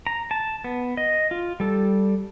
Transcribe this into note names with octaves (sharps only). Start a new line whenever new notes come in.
A#5
A5
B3
D#5
F4
G3 A4